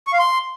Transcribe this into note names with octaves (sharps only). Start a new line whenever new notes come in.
C#6
F5
C6